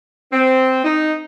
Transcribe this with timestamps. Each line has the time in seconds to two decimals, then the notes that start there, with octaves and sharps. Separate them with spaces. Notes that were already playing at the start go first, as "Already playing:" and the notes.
0.32 C4
0.84 D#4